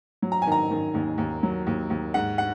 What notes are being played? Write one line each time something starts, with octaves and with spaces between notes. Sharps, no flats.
F#3
A#5
G#5
D#3 A#5
D#3
D#2
D#2
F#3
D#2
D#2
G#2 F#5
F#5